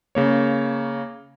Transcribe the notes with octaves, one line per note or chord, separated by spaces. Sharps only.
C#3 A#3 C#5